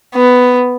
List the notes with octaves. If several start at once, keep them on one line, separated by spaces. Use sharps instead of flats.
B3